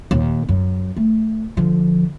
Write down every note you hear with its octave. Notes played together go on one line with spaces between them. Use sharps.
D#2 A#2
F#2
A3
D3 F3